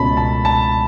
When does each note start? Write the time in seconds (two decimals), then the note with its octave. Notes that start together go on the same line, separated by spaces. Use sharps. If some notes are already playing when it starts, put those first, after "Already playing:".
Already playing: C#2 B2 A3 C#4 A5 B5
0.17 A5
0.45 A5